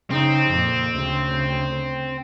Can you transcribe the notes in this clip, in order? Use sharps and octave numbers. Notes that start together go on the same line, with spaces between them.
C#3 C4 D#4
F2 A#2
D2 C#3